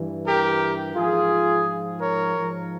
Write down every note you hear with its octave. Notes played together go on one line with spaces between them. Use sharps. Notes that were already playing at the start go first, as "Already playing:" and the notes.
Already playing: G2 E3
G4 A#4
G#2 F3 F4 G#4
A#4 C#5
G#2 F3